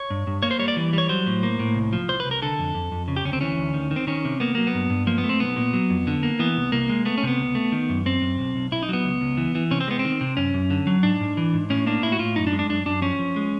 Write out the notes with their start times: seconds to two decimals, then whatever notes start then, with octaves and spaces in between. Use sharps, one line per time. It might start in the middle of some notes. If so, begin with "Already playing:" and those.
Already playing: C#5
0.10 G2
0.27 G2
0.43 A#3 C#5
0.51 C5
0.59 G3 C#5
0.68 D5
0.76 E3
0.93 G3 C#5
1.09 F#3 C5
1.26 A2
1.43 A#3
1.59 A2
1.75 C2
1.93 F3
2.08 C2 C5
2.20 B4
2.26 C2
2.31 A#4
2.42 D3 A4
2.59 F2
2.74 F2
2.92 F2
3.08 C#3
3.16 G4
3.25 D2 C#4
3.33 C4
3.41 E3 C#4
3.58 D2
3.74 D#3
3.91 D#3
3.96 C4
4.07 D#3 C#4
4.25 C3
4.40 A#3 B3
4.55 F#3 A#3
4.67 B3
4.75 G2
4.90 G2
5.07 F3 A#3
5.18 B3
5.24 A3
5.29 C4
5.40 B1 B3
5.56 A#2
5.73 F#3
5.90 F2
6.07 D3
6.23 A#3
6.39 E3 B3
6.56 C2
6.72 C2 A#3
6.89 G#3
7.05 A3 B3
7.18 C#4
7.23 C3 B3
7.39 C#2
7.55 A3
7.72 D#3
7.89 F#2
8.05 F#2 C4
8.22 F#2
8.39 B1
8.55 B1
8.71 B1 E4
8.83 D#4
8.89 F#3 B3
9.05 C#2
9.21 C#2
9.37 E3
9.55 E3
9.71 C3 C#4
9.81 C4
9.88 G#3 B3
9.99 C4
10.05 D#3
10.21 C3
10.37 F#2 C#4
10.54 F#2
10.70 D3
10.87 F#3
11.03 G#2 D4
11.21 G#2
11.37 E3
11.54 G#2
11.70 A2 C#4
11.86 A#3 D4
12.02 A2 E4
12.12 F#4
12.19 A2 F4
12.36 F#2 D#4
12.47 D4
12.53 G#3
12.59 D4
12.69 F#2 D4
12.86 F#2 D4
13.02 F3 C#4
13.19 F3
13.36 G#3